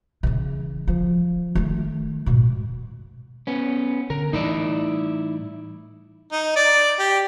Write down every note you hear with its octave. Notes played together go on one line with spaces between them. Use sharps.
C#3 E3
F3
D#3 A3
G#2 B2
B3 C#4
D3 A#4
A2 E3 G3 D#4 E4 D5
D#4
D5
G4